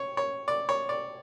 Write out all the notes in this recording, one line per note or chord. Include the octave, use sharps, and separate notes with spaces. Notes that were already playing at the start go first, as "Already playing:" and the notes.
Already playing: C#5
C#5
D5
C#5
D5